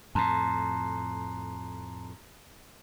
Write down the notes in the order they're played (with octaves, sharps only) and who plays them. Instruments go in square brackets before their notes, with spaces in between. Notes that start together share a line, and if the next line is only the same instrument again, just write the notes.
[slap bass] F2 A2 [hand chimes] A5 A#5 C6